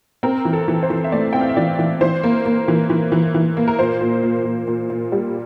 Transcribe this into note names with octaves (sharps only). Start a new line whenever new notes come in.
C4 A#4
E3
A4
E3
C5
E3
E5
A3 D5
C4 G5
F5
E5
E3 D5
E3
E3 C5
A#3
A#3
E3
E3
E3
E3
A#3
A#4
A#2 C5
A#2
A#2
A#2
A#2
A#2
G3